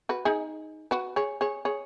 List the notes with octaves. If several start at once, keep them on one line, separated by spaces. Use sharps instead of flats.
F#4 B4
D#4 G#4
F#4 B4
G#4 C#5
G#4 C#5
G#4 C#5